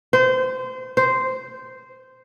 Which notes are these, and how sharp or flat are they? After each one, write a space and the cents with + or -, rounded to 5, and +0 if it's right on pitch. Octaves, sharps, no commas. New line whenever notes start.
C5 -25
C5 -10